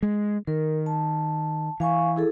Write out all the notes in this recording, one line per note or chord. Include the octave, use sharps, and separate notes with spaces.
G#3
D#3 A#4
A5
E3 F5 G#5 C#6
E4 G#4 A4